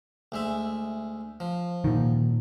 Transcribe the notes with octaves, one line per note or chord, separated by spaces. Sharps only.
D2 G#3 E5
F3
A#2 D#3